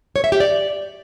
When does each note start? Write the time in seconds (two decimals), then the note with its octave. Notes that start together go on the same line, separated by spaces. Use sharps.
0.16 C#5
0.24 E5
0.32 G4
0.40 D5